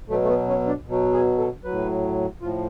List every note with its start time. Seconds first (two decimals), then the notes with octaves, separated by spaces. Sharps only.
0.09 B2 F#3 A3
0.23 A3
0.28 B3
0.48 C#4
0.67 D4
0.87 B2 F#3
1.13 G#4
1.38 A4
1.64 A2 F#3 B4
2.42 A2 F3 F4